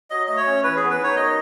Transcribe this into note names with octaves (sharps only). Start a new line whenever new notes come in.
F#3 D#5
A3 D#5
C#5
C#4
E3 B4
B3 G#4
B4
D#4 C#5
F#2 D#5